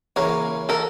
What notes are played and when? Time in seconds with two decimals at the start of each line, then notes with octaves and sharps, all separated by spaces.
0.16 C#3 E3 A#3 A#4 C#5
0.69 A4 A#4